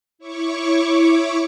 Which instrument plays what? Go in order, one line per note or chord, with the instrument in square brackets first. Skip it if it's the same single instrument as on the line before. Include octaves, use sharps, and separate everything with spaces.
[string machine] E4 C#5 C#6 D6